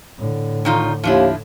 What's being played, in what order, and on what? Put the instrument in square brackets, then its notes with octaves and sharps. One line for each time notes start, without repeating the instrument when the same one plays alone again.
[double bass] A2 D3
[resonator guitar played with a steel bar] D#3 D#4 F4
[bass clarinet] D#2 [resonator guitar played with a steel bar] F3 D4 E4